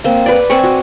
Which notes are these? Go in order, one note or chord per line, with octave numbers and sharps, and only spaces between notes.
A#3 C4
B4 D5
C4 D5 G#5 C#6
F#4